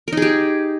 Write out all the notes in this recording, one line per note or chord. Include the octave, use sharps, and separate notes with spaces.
D#4 G4 G#4 A#4